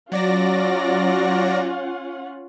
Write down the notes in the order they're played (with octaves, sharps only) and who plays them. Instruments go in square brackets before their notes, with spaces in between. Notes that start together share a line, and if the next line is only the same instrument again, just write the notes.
[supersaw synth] F#3 D5 A#6 [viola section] C#4 F4 F#5